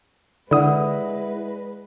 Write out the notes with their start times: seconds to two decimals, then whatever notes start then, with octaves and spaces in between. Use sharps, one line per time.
0.51 D3 G#3 E4 B4 D5 F#5 D#6